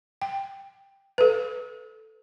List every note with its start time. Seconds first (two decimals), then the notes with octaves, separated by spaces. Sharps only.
0.22 G5
1.18 A4 B4